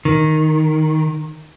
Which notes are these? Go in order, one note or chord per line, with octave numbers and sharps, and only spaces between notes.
D#3